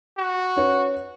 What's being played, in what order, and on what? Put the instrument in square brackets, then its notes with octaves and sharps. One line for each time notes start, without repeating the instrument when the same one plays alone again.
[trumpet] F#4
[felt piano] C#4 B4 C#5